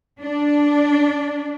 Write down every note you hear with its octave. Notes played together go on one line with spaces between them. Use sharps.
D4